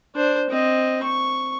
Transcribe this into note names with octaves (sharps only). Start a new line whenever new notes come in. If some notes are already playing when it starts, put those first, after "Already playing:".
D4 C5
C4 D#5
C#6